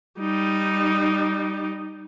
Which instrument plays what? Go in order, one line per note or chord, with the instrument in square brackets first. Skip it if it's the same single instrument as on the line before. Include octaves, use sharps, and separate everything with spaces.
[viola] G3 D#4